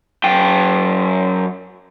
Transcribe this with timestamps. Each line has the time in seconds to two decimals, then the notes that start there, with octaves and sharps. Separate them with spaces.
0.24 F#2 G5